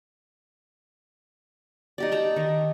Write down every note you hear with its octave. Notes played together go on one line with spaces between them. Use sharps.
D#4 G4 D5
G5 A5 A#5
D#3